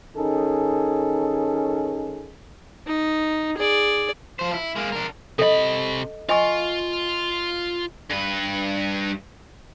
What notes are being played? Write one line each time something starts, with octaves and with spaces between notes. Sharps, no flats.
D#3 C#4 D#4 G#4 A4
D#4
G#4 D5
F3 C5
E4
G#3 A#3
D4 A#4
C3 A4 D#5 B5
F4 D#5 G#5 C#6
G2 B4